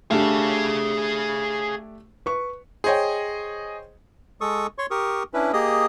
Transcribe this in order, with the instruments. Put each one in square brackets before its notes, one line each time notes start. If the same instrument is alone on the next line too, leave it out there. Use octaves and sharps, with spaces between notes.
[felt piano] A3 D4 G4 [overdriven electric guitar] G#4 F5
[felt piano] B4 C#6
[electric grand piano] G#4 D#5 [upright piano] C5 C#5 G5
[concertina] G#3 A4 C#6 D#6
C#5 C6 C#6
G4 A#4 C#6 D#6
C#4 D4 E4 B4
A#3 G4 G#4 D#5 D#6